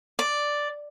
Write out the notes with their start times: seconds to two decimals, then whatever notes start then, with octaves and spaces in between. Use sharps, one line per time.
0.19 D5